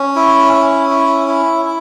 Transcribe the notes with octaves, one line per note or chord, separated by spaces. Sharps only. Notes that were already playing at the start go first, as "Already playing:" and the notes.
Already playing: C#4
E4
C#4
E4
E4
E4